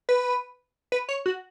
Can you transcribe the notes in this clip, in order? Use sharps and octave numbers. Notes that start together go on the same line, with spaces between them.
B4
B4
C#5
F#4